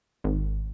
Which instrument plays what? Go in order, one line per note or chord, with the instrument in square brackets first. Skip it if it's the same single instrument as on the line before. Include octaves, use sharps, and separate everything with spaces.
[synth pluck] G#1